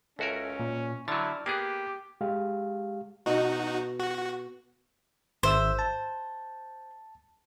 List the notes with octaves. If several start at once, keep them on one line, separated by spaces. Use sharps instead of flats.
C#2 C#4 F#4 A4 A#4 E5 G#5
A#2
D3 F#3 E4 D5 F6 A6
A#3 B3 G4 G#4 D6 F#6
G#3 G4 F5
B2 D#4 F#4
F#4
G#1 C5 E5 E6
A5